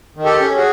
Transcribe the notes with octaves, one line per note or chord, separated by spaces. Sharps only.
D#3
G4 A4
C#4
F#4 G#4